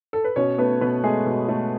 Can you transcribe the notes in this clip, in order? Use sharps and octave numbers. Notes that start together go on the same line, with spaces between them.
A4
B4
B2 C#4 C#5
A3 B3 B4
B2 B3 B4
G#3 A3 G#4
B2
A3